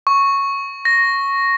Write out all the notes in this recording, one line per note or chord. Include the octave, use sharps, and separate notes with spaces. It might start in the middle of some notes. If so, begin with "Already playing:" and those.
C#6
A#6